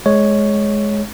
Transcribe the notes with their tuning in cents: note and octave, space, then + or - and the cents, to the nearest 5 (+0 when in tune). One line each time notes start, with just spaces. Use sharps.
G#3 +15 C#5 +0